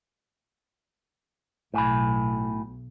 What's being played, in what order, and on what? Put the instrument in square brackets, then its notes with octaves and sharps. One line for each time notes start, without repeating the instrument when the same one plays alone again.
[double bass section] B1 [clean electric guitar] A2 G#5 B5